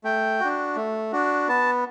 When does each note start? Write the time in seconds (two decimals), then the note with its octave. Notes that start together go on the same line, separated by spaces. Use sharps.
0.04 A3 G5
0.40 D4 F#4
0.76 A3
1.12 D4 F#4
1.48 B3 A5